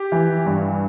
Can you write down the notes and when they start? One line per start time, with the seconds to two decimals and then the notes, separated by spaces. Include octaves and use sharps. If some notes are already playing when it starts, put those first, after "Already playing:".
Already playing: G4
0.12 E3
0.46 G2